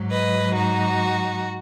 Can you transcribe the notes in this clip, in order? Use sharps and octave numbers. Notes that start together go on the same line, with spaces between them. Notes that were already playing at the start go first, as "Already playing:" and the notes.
Already playing: G#2 F#3
B4 D#5
D#4 F#4